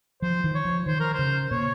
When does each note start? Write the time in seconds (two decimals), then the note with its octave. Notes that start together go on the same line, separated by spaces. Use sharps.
0.22 F3 C5
0.44 D#3
0.55 C#5
0.65 F3
0.86 D#3 C5
1.00 A#4
1.13 C5
1.19 C#3
1.51 A#2 C#5